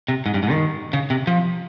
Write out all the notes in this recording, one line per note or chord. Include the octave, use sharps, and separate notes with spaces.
C3
G#2
G2
G#2
D#3
C#3
C3
F3